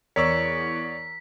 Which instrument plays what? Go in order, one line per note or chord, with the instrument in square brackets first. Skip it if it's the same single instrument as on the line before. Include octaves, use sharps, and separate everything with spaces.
[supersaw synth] E2 [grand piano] A#4 E6 [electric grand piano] C#5 D5 C#6 [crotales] B6